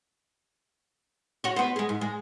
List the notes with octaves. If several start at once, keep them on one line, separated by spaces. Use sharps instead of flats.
F#4 C#5
B3 C5
G#3 G#4
G#2
G#3